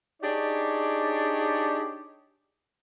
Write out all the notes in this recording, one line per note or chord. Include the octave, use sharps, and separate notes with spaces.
D4 D#4 G4 G#4 C#5 D5